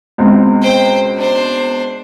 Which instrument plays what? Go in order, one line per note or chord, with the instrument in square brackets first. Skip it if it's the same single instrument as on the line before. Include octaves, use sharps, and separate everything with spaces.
[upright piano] C#2 B2 C4
[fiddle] C5 G5
D4 C5